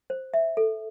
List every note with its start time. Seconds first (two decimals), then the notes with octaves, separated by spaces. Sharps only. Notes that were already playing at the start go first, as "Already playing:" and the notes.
0.10 C5
0.34 E5
0.57 A4